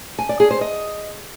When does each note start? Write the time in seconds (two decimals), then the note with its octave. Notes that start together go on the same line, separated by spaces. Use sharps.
0.19 G#5
0.29 D5
0.40 G#4
0.50 C5
0.61 D#5